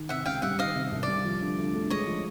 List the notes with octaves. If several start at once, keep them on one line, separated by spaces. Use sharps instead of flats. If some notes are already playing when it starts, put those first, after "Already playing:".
Already playing: D#3
C3 E5 F#5
C#2 F5 G5
G3 E5 F#5
D#3 D#5 F5
C3
C2
G3 D5
F3
D3
D2
A3
G#3 C#5 D#5
F3